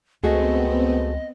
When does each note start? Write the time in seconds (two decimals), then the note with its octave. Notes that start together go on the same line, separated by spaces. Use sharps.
0.24 C#2 A3 B3 C4 F#4 G#4 D#5